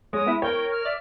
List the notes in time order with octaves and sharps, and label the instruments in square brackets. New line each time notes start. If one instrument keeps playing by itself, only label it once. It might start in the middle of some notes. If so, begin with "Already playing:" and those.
[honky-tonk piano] G#3 [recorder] C#5 [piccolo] D#6
[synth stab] B3 E4 [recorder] E5
[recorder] A#4 [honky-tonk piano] C#5 [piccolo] G5
[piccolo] F6
[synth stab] D5 [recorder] E5